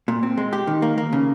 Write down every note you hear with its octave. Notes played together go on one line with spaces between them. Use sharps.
A#2
C4
G#3
G4
D#3
A#3
A#3
C#3